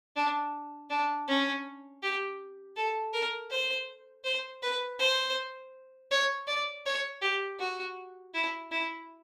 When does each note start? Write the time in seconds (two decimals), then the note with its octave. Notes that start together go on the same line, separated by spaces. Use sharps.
0.16 D4
0.90 D4
1.28 C#4
2.02 G4
2.76 A4
3.13 A#4
3.50 C5
4.24 C5
4.62 B4
4.99 C5
6.11 C#5
6.47 D5
6.85 C#5
7.22 G4
7.59 F#4
8.34 E4
8.71 E4